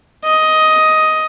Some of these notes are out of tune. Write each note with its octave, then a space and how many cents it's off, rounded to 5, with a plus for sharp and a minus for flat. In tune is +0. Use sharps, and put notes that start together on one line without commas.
D#5 +10